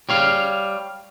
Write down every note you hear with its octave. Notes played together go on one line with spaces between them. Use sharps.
G3 C#5 F5